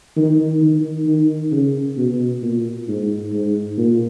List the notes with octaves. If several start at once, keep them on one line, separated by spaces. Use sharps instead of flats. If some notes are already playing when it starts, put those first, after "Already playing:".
D#3
D#3
D#3
C#3
B2
A#2
G#2
G#2
A#2